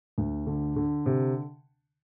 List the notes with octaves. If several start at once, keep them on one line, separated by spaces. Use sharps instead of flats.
D2
D3
D3
C3